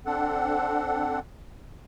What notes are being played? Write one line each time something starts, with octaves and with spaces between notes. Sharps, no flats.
C4 D4 A4 F#5